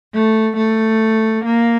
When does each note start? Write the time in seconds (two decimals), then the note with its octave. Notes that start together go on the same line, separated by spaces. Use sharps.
0.13 A3
0.56 A3
1.44 A#3